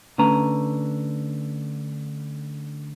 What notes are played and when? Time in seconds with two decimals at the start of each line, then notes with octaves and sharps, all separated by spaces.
0.18 D3 A3 C#4 B4 A#5